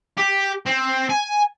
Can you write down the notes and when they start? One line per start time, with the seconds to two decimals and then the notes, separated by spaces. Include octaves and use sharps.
0.17 G4
0.66 C4
1.09 G#5